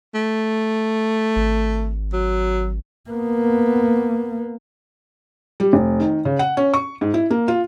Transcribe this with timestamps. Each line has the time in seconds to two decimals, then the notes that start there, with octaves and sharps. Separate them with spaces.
0.14 A3
1.36 G#1
2.13 F#3
3.10 A#3 B3
5.60 G3
5.73 F1
6.00 D#3
6.25 C#3
6.39 F#5
6.57 C#4
6.74 C#6
7.01 G#2
7.14 E4
7.30 A#3
7.48 F4